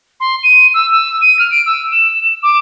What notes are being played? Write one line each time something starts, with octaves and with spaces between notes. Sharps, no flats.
C6
D#7
E6
E6
D#7
F6
D7
E6
E7
D6